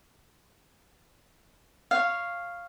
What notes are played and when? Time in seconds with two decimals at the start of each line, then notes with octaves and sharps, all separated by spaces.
1.91 C#5 F5